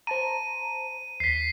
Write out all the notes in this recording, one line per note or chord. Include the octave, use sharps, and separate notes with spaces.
C5 A5 A#5 D#7
D#2 B6 C7